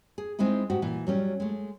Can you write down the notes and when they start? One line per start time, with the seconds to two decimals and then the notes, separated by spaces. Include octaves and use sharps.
0.18 G#4
0.39 G#3 C4 D#4 E4 G#4
0.70 G#2 F#4 G4
0.82 A#2 E3
1.07 F#3 G3 C#4
1.40 G#3 A3